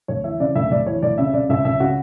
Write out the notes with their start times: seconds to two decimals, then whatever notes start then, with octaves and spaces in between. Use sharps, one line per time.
0.08 D2 C#5
0.24 E3 E5
0.40 C#3 D5
0.55 D2 E5
0.71 D2 D5
0.86 E3 C#5
1.02 D2 D5
1.18 C#3 E5
1.33 C#3 D5
1.49 C#2 E5
1.65 C#2 E5
1.80 C#3 F#4